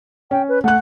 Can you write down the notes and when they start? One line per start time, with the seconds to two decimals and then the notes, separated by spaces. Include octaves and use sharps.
0.31 C#4 G5
0.49 B4
0.64 A3 F#5 F#6